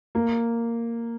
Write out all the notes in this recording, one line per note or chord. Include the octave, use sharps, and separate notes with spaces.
A#3